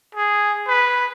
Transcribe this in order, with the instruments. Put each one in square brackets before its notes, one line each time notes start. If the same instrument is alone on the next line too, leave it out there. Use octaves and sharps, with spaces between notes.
[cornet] G#4
B4